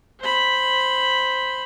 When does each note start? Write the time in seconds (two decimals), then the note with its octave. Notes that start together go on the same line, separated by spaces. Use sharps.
0.21 C5 B5